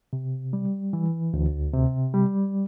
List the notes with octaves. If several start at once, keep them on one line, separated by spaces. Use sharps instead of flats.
C3
G3
E3
D2
C3
G3